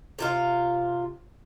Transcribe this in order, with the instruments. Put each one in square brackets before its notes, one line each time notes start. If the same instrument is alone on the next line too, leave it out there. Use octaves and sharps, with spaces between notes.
[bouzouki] C3 F4 F5